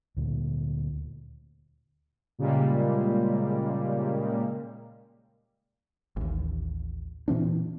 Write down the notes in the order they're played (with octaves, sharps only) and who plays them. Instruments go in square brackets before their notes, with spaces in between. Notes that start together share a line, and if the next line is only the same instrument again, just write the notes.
[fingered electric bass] D2 A#2
[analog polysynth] A#2 C#3 G3 G#3 A#3
[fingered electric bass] A1 D#2
A#2 E3 C4 D4